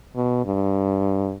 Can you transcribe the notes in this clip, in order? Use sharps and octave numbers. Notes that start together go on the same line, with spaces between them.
B2
G2